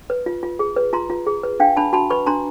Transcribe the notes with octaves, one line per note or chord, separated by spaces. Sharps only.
B4
F4
F4
G#4
B4
F4 A#5 C6
F4
G#4
B4
D4 F5 G5
D4 A5 B5
F#4 A5 B5
B4 B5 C#6
D4 A#5 C6